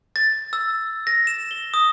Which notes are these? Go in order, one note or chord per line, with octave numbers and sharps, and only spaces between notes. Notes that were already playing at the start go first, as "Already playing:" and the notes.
A6
E6
A#6
E7
G7
D#6